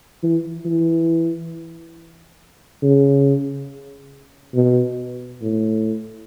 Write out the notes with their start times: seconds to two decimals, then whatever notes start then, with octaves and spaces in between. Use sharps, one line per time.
0.23 E3
0.65 E3
2.82 C#3
4.54 B2
5.41 A2